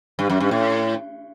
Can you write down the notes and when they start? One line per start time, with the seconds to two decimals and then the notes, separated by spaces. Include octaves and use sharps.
0.19 G2
0.30 F#2
0.40 G2
0.51 A2